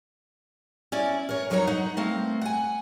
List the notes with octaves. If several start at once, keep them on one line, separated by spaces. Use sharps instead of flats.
C#4 E4 D5
A#4 C#5
F2 F#3 D#4 A#4 C#5 A#5
D#4 F#5
A3 A#3 C4
F#5 G#5